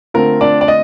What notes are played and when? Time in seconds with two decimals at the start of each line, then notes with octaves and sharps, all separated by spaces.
0.14 D3 A3 C4 F4 A#4
0.41 D4 D5
0.61 D5
0.68 D#5